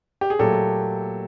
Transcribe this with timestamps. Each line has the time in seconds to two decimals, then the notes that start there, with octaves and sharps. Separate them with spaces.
0.21 G4
0.30 G#4
0.39 A#2 F#3 A3 G4 A4